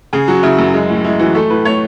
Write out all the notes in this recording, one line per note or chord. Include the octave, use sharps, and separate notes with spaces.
C#3 G#4
F#3 F#4
C#3 E4
F#2
G#3
A2
G#3 E4
E3 F#4
A3 A4
A2 B4
A3 C#5